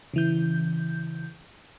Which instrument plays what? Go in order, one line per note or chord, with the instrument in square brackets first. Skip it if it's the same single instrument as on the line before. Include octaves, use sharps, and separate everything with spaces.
[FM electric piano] C#3 E3 G6